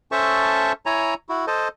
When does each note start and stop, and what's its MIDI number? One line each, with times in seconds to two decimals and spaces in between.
0.12 0.72 61
0.12 0.72 69
0.12 0.72 72
0.12 0.72 76
0.12 0.72 81
0.12 0.72 85
0.86 1.14 64
0.86 1.14 73
0.86 1.14 80
0.86 1.14 82
1.29 1.45 64
1.29 1.45 66
1.47 1.68 69
1.47 1.68 72
1.47 1.68 75